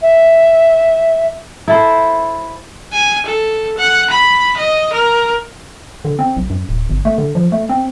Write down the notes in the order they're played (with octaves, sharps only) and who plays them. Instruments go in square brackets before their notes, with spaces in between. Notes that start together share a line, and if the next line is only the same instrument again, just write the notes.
[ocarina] E5
[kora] E4 A4 C5
[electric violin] G#5
A4
F#5
B5
D#5
A#4
[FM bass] D3
C4
B1
F#2
D1
G1
A3
D3
F3
A3
C4